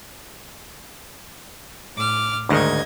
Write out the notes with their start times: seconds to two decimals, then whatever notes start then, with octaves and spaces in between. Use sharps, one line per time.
1.95 A2 D6 F6
2.49 D2 G#2 D#3 D#5 G#6